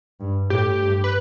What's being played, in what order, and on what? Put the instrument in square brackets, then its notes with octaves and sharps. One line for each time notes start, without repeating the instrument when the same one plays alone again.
[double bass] G2
[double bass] A2 [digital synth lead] G4
[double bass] G2
[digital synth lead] B4